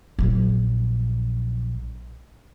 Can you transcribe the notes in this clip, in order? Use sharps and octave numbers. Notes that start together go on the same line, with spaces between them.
A#1 F#3